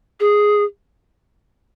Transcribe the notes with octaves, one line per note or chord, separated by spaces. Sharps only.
G#4